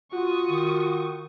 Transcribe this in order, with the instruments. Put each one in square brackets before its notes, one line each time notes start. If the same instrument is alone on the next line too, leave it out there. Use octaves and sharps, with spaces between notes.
[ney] F4 [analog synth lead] F#4 [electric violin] C#6 D#6
[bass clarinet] D#3